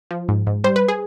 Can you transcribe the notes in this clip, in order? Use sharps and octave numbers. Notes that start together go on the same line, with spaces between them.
F3
G#2
G#2
G3 C5
B4
G#4